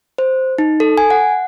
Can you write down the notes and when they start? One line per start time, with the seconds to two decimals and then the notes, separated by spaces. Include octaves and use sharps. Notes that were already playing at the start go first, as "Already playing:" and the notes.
0.18 C5
0.58 D#4
0.80 A4
0.98 G#5
1.10 F#5